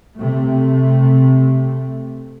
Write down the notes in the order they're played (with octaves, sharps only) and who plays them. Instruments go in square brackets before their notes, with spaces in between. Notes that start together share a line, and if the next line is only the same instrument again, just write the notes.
[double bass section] C3 A3